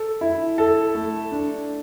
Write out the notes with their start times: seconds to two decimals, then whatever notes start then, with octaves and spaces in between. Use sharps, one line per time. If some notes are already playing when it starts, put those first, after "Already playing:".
Already playing: A4
0.21 E4
0.58 A4
0.95 A3
1.31 D4